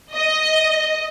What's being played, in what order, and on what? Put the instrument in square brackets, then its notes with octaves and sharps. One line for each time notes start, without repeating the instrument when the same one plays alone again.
[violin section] D#5